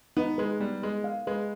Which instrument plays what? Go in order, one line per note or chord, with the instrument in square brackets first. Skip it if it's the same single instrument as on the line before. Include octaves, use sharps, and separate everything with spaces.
[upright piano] B3 [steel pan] D#4
[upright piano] G#3 [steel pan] B4
[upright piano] G3 [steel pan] B3
[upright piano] G#3 [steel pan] B4
[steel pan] F5
[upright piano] G#3 [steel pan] B4